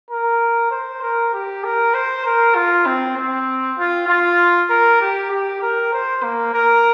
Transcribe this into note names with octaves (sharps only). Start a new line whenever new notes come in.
A#4
C5
A#4
G4
A#4
C5
A#4
F4
C4
C4
F4
F4
A#4
G4
G4
A#4
C5
A#3
A#4